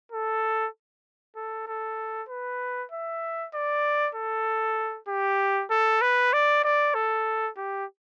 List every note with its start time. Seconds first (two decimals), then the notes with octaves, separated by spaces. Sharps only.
0.12 A4
1.36 A4
1.67 A4
2.29 B4
2.92 E5
3.54 D5
4.15 A4
5.08 G4
5.70 A4
6.02 B4
6.33 D5
6.64 D5
6.94 A4
7.57 G4